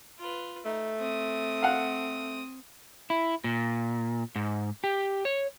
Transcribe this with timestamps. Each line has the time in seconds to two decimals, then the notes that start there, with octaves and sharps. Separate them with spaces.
0.19 F4 B4
0.65 A3 D#4
0.99 C4 D#6
1.62 F5 F#5
3.10 E4
3.44 A#2
4.36 G#2
4.84 G4
5.25 C#5